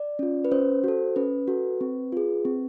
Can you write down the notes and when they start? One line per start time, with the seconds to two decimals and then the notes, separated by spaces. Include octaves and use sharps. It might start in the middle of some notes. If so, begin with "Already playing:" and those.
Already playing: D5
0.19 C#4 F4
0.45 B4
0.51 C#4 C5
0.84 F#4 A4
1.16 C#4 B4
1.48 F#4 A4
1.81 C4
2.12 F4 G#4
2.45 C4